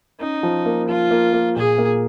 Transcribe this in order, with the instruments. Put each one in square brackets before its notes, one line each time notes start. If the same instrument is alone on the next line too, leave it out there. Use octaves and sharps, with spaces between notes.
[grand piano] C#4 [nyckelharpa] D#4
[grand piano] F3
A#3
[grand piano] F3 [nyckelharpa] F4
[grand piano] A#3
A#3
[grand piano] A#2 [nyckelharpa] G#4
[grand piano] A#3